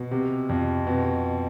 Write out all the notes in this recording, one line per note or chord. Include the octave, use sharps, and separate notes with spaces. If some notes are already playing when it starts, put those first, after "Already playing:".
Already playing: B2
C3
F2
B2